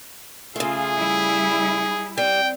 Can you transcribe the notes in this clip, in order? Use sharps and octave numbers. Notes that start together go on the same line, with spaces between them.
C#3 A3 F4 G#4
G3 E4
G3 C4 G5